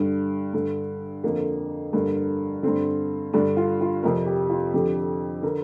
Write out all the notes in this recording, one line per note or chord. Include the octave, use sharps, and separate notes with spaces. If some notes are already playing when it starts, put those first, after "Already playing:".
Already playing: G2 D3
G2 D3
F2 D3 A#3
G2 D3 A#3
G2 D3 C4
G2 D3 D4
F4
F4
F2 C3 A#4
G4
F4
F2 D3 G4
D3 A#4